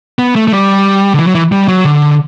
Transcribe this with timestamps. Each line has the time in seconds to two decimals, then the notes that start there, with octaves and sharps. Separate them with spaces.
0.19 B3
0.36 A3
0.48 A3
0.52 G3
1.14 D3
1.19 E3
1.27 F#3
1.35 E3
1.52 G3
1.68 F#3
1.85 D3